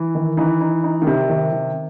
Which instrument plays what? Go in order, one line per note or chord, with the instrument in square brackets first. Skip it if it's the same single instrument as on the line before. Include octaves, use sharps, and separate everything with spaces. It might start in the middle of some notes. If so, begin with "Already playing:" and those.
Already playing: [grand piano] E3
[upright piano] D#3
[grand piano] E3 [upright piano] D#4
[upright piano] D#4
D#4
[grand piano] D#3
[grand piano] C3 [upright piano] G3
[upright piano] D#3
D#3